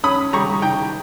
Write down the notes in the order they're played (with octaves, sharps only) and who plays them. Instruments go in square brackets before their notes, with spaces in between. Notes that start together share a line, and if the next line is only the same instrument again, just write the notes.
[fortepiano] C#4 B5 D#6
G3 A#5 C#6
D#3 G5 A#5